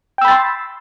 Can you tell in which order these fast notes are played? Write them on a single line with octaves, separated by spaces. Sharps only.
G5 E6 B5 A6 C6